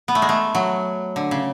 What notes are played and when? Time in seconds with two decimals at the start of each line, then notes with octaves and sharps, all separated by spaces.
0.08 B3
0.15 A3
0.22 G#3
0.29 A3
0.55 F#3
1.16 D3
1.31 C#3